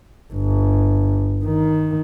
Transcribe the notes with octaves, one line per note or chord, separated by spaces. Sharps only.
G1
D#3